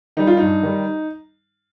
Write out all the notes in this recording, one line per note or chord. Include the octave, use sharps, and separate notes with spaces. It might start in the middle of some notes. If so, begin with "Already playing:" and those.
D#3 G3 D#4
F4
G2 D#4
D#3 G3